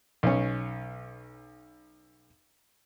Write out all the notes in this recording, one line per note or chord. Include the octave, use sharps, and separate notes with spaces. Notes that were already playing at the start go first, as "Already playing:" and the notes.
B1 C#4